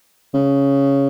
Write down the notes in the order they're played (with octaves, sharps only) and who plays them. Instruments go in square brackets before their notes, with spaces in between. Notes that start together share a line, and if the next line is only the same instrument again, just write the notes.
[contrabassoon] C#3